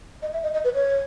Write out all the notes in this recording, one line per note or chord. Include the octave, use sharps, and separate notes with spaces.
D#5
E5
D#5
D#5
B4
C#5